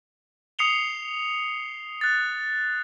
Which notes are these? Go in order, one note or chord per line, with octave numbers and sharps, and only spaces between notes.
D#6 C7 C#7 F7 G7
F#6 A6